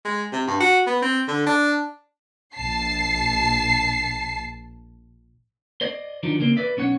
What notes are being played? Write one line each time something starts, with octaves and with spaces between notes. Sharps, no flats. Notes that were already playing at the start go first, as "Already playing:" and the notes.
G#3
C3
G2
F#4
B3
C4
D3
D4
A#1 A5 C7
C5 D5 D#5
D#3 F3 F#3 D4 D#4
C#3 G3 A#3 C4
B4 D5 E5
B1 C#4 C#5 F#5